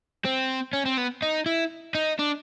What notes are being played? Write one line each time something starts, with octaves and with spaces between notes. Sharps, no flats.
C4
C#4
C4
B3
D#4
E4
D#4
D4